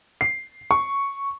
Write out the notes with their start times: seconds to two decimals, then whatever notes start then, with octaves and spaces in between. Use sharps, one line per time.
0.21 C7
0.71 C#6